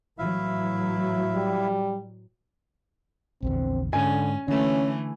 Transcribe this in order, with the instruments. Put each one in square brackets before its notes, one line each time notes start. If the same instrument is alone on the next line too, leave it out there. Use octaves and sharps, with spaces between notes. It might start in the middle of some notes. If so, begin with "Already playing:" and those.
[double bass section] A2 E3 F#3 [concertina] E4 E5 F5
[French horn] G3
[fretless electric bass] A#1 E2 D3 [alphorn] C4
[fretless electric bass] G#2 [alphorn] D3 [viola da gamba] C#4 [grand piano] G#5
[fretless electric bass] D3 [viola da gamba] E3 A3 [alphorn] C#4